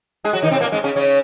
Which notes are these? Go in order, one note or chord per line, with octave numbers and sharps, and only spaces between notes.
G#3 G#4
F#3 F#4
D#3 D#4
C3 C4
A#2 A#3
G#2 G#3
C#3 C#4
C#3 C#4